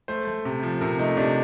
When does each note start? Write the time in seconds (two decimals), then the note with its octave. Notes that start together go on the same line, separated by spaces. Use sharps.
0.08 A3 C5
0.27 A3
0.45 C3
0.63 F3
0.81 C3 A#4
0.99 A3 D#4
1.17 C3 D4